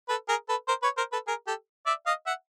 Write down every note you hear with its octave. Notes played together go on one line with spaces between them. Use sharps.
A4 B4
G#4 A#4
A4 B4
A#4 C5
B4 C#5
A#4 C5
A4 B4
G#4 A#4
G4 A4
D5 E5
D#5 F5
E5 F#5